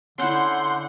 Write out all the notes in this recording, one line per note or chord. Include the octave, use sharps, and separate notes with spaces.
D3 C#4 E4 F#5 C6 G6